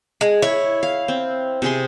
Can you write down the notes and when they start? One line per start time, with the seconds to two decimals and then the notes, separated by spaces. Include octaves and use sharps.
0.21 G#3
0.42 E4 C#5
0.83 F5
1.08 C4
1.62 C3 G#4 C6